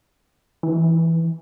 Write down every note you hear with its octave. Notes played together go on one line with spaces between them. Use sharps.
E3